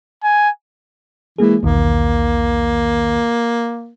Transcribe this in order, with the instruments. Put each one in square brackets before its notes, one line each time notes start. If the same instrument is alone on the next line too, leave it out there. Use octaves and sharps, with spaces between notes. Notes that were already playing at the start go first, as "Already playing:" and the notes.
[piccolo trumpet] G#5
[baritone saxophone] E3 [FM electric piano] G#3 A#3 G#4
[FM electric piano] B1 E2 D#3 [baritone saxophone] A#3